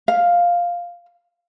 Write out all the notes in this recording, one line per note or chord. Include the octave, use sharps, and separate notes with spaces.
F5